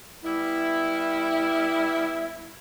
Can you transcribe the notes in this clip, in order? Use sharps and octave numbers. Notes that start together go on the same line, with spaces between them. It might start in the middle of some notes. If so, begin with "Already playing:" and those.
G3 B3 E4